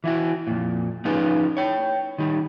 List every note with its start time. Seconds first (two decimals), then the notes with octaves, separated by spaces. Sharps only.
0.04 E3 E4 F#4
0.47 F2 A#2
1.05 F3 C#4 D#4 F4 G#4 B4
1.57 C#5 G5
2.18 D#3 G3